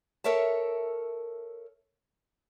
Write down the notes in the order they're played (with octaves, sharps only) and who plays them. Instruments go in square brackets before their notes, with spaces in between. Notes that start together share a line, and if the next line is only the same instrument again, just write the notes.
[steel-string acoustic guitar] A4 A#4 C#5 E5 A5